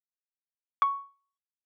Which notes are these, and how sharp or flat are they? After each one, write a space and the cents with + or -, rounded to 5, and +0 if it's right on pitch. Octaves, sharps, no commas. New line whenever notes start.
C#6 +5